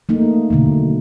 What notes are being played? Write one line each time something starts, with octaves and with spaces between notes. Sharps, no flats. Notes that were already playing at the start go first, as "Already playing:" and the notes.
A3 A#3 D#4
B2 D3 D#3 F#3